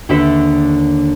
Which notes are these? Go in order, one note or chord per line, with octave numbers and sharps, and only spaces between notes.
D#2 D3 D4 A4 B4 E5